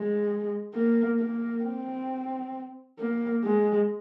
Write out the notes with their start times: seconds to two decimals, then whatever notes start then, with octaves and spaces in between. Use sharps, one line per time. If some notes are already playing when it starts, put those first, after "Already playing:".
Already playing: G#3
0.75 A#3
1.19 A#3
1.64 C4
2.99 A#3
3.44 G#3